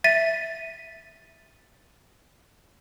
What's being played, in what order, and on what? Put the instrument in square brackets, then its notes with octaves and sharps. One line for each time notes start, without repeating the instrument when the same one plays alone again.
[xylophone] E5 A6 B6 D#7